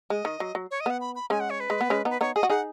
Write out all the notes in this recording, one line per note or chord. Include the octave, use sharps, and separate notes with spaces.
G#3 D#5
D#3
F#3
F#3
C#5
D#5
B3 F#5
B5
B5
G#3 C#4 G#5
F#5
C#5
B4
G#3
B3
G#3 C#4
B3 D#4 B4
B3 D#4 C#5
G#4 D#5
F#4
D#4 G#4 F#5